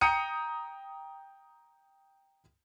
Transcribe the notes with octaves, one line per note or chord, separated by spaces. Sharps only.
G5 A#5 D#6 G6 C#7 D#7